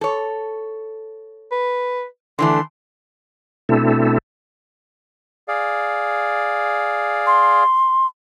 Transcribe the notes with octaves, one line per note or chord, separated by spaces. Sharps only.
A4 C#5
B4
D3 E3 A3 C6
B2 A3 C4 D4 E4 A4
G#4 D5 F5
C6